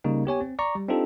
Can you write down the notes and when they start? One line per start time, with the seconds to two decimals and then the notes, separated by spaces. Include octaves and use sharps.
0.04 C#3 G3 A#3 D#4
0.25 B3 G4 C#5 G#5
0.41 C4
0.59 D5 A#5 C#6
0.75 G3
0.88 C4 D4 D#4 F4 G4 A4